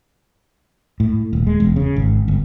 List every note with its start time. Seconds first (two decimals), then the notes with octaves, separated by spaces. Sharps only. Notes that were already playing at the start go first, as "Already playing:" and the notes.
1.00 A2
1.33 D#1
1.47 G#3
1.60 E1
1.76 C#3
1.96 G#1
2.28 G1